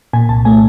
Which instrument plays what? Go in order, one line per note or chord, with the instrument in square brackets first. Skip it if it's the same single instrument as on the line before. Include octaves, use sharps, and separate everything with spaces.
[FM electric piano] A#2 G#5
C2 A5
A3 G#5